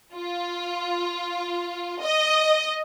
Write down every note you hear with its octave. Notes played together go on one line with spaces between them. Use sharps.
F4
D#5